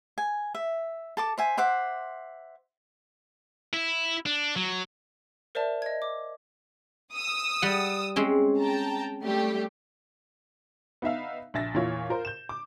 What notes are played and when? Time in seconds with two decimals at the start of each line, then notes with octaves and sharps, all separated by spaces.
0.18 G#5
0.55 E5
1.17 A4 A5 D6
1.38 C5 E5 G#5
1.57 C5 E5 F#5 D6
3.74 E4
4.26 D4
4.56 F#3
5.55 A#4 C5 D5 E5 A5
5.82 D#5 G#6
6.02 D6
7.13 D#6 E6
7.62 G3 F#5
8.16 G#3 C4 C#4
8.58 G5 A5 A#5
9.22 G3 A3 G4
11.02 B3 D#4 E5 F5
11.54 A#1 E5 A6 A#6
11.74 E2 A#2 E4 F4 C#5
12.09 F4 A#4 C5
12.25 G6 E7
12.49 D6